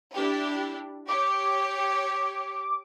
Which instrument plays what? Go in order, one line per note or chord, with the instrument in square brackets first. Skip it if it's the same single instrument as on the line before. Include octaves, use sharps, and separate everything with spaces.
[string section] D4 E4 G4
[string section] G4 C#5 [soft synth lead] D6